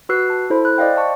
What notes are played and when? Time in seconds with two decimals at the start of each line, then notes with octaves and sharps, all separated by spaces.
0.09 F#4 B4 E6 F#6 C7
0.30 A5
0.50 E4 A4 C5 B5
0.65 F#6
0.78 C5 D5 D#5 F5 G5
0.96 F5 A5 C#6